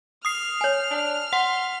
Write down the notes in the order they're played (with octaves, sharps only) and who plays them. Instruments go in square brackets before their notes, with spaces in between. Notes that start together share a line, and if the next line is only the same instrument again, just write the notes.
[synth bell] D#6 C7 [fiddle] F6
[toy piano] C#5 G#5
[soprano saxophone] D4
[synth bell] F#5 [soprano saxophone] C6